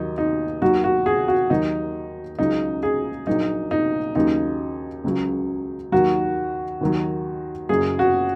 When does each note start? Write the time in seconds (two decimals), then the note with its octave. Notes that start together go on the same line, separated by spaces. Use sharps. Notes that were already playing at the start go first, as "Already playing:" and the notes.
Already playing: D#2 D#3 F#3 D#4
0.18 D#4
0.62 D#2 D#3 F#3 F#4
0.84 F#4
1.06 G#4
1.28 F#4
1.50 D#2 D#3 F#3 D#4
2.39 C#2 C#3 F#3 D#4
2.83 G#4
3.27 A#1 A#2 F#3 D#4
3.71 D#4
4.15 D#2 C#3 F#3 D#4
5.04 C#2 C#3 F#3
5.92 D#2 D#3 F#3 F#4
6.81 D#2 D#3 F#3
7.69 F#1 F#2 F#3 G#4
7.99 F#4